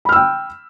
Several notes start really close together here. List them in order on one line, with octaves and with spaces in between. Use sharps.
B5 F6 E6 G5